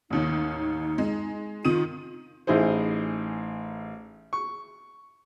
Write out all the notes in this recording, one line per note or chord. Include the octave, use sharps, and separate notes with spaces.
A1 D#2 D#3 D#4
G#3
D#3 F4 D#6 D#7
A1 D#4 E4 G#4 C5
C#6